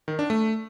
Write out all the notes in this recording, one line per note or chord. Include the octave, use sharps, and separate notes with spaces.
D#3
D4
A3